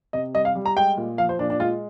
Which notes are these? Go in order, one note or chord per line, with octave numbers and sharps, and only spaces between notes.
C3 D#5
G3 D#5
F5
G3
A#5
G#3 G5
A#2
F3 F5
C5
A#2 D4
D4
G#3 F4